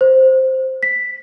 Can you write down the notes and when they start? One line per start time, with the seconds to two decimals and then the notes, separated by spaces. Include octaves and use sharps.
0.01 C5
0.83 B6